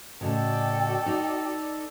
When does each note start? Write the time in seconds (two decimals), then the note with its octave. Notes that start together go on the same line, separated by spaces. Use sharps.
0.21 A2 C#3 F#4 A4 D5 D#5 G5
1.06 D#4